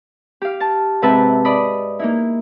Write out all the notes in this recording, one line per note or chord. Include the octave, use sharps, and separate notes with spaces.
G4 F5
A5
G#2 C3 B4 E5 A5
D5 D#5 B5
A#3 D#4 E4